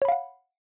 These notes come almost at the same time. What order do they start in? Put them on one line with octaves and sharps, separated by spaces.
C#5 B5 F5 F#5